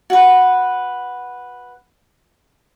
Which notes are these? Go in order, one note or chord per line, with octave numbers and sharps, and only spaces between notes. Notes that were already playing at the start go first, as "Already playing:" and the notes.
F#4 B4